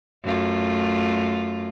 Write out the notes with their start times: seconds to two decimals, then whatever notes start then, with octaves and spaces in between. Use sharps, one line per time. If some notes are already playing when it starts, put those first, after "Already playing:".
0.24 F#2 A3 F4